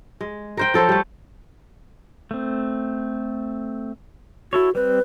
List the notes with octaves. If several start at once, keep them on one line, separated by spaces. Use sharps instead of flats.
G#3
A#4 C5 G5
F3 A4 C5 C#5
G3 A3
A3 C4
E4 F#4 A4 C#5
G3 C4 B4